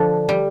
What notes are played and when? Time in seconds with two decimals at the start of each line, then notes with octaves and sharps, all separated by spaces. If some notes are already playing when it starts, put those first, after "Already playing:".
Already playing: D3 F3 D4
0.29 G3